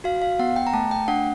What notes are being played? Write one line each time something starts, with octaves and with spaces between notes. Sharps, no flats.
F#4 F5
F5
B3 F#5
G5
A#5
A3 A5
G5
D4 F#5